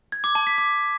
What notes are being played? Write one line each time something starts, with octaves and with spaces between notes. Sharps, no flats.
G#6
D6
A5
B6
D6